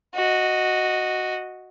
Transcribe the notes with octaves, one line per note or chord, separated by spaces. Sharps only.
F#4 D#5